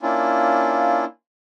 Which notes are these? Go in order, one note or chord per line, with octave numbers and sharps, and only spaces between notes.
A#3 C#4 D4 E4 F4